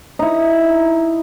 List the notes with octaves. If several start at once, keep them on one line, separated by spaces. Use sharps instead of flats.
D#4 E4